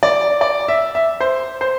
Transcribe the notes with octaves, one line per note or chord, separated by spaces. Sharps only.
D5
D5
E5
E5
C5
C5